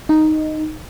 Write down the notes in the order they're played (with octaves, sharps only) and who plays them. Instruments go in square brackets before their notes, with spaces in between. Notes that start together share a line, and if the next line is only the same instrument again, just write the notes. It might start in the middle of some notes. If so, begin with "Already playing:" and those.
[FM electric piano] D#4